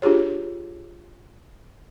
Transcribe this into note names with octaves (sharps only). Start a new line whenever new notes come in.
D4 F4 G4 G#4 C#5